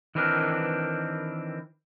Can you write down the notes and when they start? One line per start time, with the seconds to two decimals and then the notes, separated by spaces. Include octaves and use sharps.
0.15 D#3 E3 C4 D4 A#4 B4